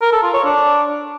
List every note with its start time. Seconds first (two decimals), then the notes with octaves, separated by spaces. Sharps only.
0.02 A#4
0.12 A4
0.23 F4
0.34 C#5
0.45 D4